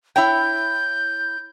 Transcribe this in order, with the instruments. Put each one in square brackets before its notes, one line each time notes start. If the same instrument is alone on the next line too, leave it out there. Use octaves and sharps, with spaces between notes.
[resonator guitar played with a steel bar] E4 C#5 G5 [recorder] G6